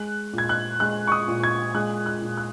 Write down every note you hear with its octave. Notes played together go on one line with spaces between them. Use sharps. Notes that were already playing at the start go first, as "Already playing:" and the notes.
Already playing: G#3 F#6
A#2
G#6
F#6
G#3 F#6
C#6
D#6
A#2
G#6
G#3 F#6
F#6
A#2
F#6